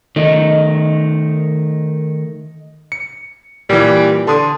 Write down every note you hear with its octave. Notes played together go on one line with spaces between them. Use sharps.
D#3 A3 D#5
C#7
A#2 E3 G3
D3 A5 C6 D#6